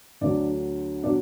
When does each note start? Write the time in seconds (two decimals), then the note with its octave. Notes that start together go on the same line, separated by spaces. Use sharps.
0.21 D2 D3 F#3 D4 D5
1.03 B2 F#3 D4 D5